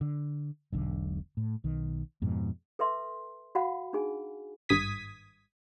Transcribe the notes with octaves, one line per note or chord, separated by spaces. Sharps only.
D3
E1 B1 D3
A2
B1 D#3
F2 G#2 B2
A4 B4 E5 C6
F#4 F5 F#5 B5
D4 D#4 G#4 G#5
G#1 G2 D#6 G#6 B6